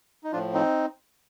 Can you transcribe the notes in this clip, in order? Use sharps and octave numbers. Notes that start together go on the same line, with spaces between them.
D#4
A2 F3 D4 F4
C4 D#4